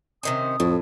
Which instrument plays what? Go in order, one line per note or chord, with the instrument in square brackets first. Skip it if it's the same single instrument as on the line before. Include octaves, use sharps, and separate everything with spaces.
[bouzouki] C3 D#3 C#4 [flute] D#6
[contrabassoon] F2 [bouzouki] A2